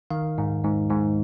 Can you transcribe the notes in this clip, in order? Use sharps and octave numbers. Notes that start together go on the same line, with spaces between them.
D#3 F5
G#2
G#2
G#2